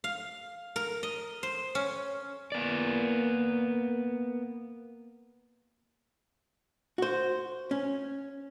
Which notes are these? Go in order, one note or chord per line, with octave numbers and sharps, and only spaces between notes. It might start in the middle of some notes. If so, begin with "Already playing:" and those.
F5
A#4
D#5
C5
C#4
A#3 B3 D5
F#4 C5
C#4